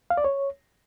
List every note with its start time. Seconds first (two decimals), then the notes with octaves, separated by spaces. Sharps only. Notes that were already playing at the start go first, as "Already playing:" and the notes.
0.10 F5
0.17 D5
0.24 C#5